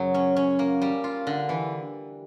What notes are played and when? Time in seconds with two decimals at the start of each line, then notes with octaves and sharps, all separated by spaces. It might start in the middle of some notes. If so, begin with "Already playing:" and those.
Already playing: F#2 C#3 F#3
0.14 C#4
0.36 C#4
0.59 A#3
0.82 G3
1.04 F4
1.27 D3
1.49 E3